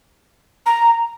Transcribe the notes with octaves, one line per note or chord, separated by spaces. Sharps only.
A#5